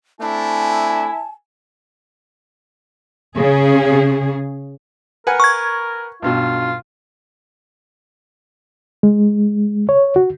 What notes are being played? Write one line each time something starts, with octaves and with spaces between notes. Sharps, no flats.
A3 C4 D4 E4 G#5 A5
C#3 G#4
A#4 B4 F#5 G#5
C#6 G#6
B1 G2 B2 F4
G#3
C#5
F#4